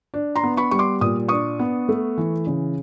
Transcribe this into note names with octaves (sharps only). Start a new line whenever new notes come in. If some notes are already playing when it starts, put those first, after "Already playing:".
D4
A#5 C6
B3
B5 C#6
G3 C#6
C6 D6
A#2 D#6
D4 C#6 D#6
B3
A3
E3
C#3